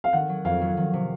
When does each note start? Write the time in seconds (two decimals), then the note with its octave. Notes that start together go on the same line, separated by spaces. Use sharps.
0.04 F5
0.13 D#3 F#5
0.29 F#3
0.45 F2 F5
0.61 F#3
0.77 D#3
0.93 C3